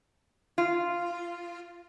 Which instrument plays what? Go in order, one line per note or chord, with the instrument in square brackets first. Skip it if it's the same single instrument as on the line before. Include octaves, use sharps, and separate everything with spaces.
[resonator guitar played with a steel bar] F4